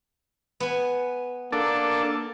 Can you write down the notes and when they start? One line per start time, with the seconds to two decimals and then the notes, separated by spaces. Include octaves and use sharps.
0.60 B3 G#5
1.52 A#3 D4 A4